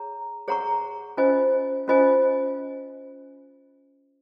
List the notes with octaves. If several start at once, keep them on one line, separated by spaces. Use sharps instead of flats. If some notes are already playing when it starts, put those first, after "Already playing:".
Already playing: G#4 C#5 A#5
G#4 C#5 F#5 A#5 C#6
C#4 F4 C5 D#5 G#5
C#4 F4 C5 D#5 G#5